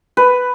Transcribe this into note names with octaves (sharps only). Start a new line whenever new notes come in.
B4